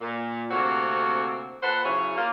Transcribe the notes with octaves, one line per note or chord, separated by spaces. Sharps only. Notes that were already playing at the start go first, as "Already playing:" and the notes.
A#2
D2 C3 A#3 C4 F#4 C#5
A#2 A4 B4 C5 F#5
C#3 F#3 E4 G#4 C#5
A#3 F4